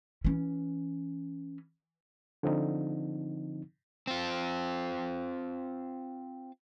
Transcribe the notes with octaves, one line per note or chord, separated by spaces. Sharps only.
E3 C#4
D3 F3 C4 D#4
C4 F4